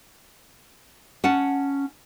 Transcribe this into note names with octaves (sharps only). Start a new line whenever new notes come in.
C#4 F#5 A5